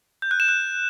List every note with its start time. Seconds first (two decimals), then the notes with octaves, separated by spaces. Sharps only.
0.22 G6
0.31 F#6
0.40 E7
0.48 F#6